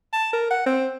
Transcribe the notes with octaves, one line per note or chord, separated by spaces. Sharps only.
A5
A#4
F#5
C4